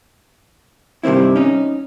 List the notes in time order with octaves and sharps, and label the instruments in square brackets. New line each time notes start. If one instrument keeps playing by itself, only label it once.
[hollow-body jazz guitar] G2 C3 D#3 C4 E4
C#4 D#4